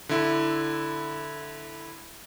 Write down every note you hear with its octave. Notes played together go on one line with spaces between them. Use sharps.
D3 E4